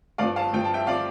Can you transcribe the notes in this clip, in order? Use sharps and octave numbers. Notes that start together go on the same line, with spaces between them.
G2 F3 D5 F5
F5 A5
G2 F3 G5
A5
E5 G5
F3 D5 F5